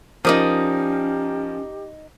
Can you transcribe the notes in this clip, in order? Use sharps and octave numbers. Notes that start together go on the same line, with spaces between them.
F3 C#4 D#4 G4 A#4 D5 D#6